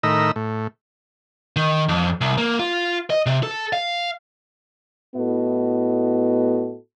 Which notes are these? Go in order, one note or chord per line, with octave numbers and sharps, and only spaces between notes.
A2 D#3 A#4 D#5 B5 E6
A2
D#3
F2
C2
A#3
F4
D#5
C3
A4
F5
A2 B3 E4 F#4 A4 D#5